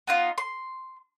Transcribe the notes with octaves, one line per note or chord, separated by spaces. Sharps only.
B3 D#4 F4
C6